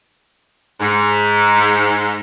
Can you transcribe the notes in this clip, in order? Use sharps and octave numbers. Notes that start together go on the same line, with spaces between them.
G#2